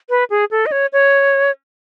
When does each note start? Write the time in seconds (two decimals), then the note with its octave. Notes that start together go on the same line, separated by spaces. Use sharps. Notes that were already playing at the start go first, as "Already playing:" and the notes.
0.09 B4
0.30 G#4
0.51 A4
0.66 D#5
0.72 C#5
0.93 C#5